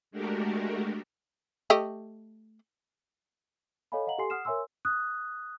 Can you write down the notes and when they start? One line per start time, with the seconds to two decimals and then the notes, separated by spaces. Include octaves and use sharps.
0.11 G#3 A3 D4 F#4 G4 A#4
1.70 A3 G4 D#5
3.92 A4 C#5 D#5 F5 G#5 B5
4.07 D#5 F5 F#5 A#5 F#7
4.18 G4 A4 G#5 C6 C7
4.30 F#5 D#6 F6 C7 E7
4.45 A#4 C#5 E5 G#5 C6 E6
4.85 D#6 F#6